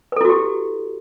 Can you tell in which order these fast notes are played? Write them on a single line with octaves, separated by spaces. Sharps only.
B4 A4 E4 F#4 G4